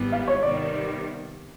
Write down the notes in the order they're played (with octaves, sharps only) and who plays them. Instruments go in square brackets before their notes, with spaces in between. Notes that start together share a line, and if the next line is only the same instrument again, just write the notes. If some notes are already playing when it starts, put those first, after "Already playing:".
Already playing: [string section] G#1 G#2 E3 G3 B3
[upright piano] F5
C#5
[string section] C3 D#3 G3 B3 [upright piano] D5